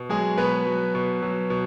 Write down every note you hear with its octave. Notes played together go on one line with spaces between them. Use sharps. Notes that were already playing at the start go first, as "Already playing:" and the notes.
Already playing: B2
F#3 G#3 G#4
B2 B3 B4
F#3
B2
F#3
B2